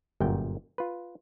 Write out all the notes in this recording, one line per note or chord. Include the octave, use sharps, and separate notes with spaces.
G1 F#2 A#2 G5
F4 B4